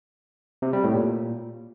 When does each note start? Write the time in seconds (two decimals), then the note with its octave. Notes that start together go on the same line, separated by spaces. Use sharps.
0.62 C3
0.73 G3
0.84 A2
0.95 A#2